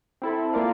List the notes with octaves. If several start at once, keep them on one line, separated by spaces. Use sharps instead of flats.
C4 E4 A4
A#3 F4 A#4 D5 F5